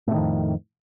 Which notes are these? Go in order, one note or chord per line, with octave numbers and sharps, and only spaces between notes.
F2 A2 C3 D#3